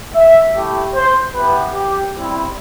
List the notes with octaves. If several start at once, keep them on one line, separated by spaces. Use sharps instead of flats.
E5
A3 E4 G4
C5
B3 E4 G4 B4
G4
G3 C4 E4